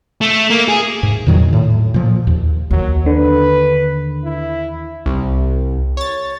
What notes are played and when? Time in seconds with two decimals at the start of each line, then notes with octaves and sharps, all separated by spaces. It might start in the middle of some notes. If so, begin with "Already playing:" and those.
0.21 A3
0.50 A#3
0.68 G#4
1.03 G#2
1.26 E2 A#2 D#3 F#3
1.53 A2
1.94 A#2 F3
2.27 D#2
2.71 D#2 F#3
3.06 D3 B4
4.25 E4
5.06 C2
5.97 C#5 A6